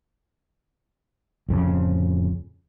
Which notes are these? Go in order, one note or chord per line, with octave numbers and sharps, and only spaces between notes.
D1 F2 C#3